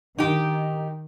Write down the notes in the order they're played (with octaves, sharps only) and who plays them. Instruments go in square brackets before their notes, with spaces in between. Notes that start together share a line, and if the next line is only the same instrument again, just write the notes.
[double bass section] D#3 [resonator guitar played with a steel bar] D#4 G4